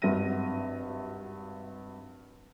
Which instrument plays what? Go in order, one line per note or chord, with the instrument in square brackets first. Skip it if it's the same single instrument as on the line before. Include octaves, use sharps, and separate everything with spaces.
[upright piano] G#1 G2 F#3 E5 A#6 D#7